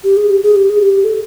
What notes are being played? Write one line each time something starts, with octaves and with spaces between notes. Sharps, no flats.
G4
G#4
G4
G#4
G4
G#4
G4
A4